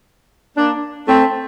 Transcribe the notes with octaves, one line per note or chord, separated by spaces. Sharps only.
A#3 D4
A3 C4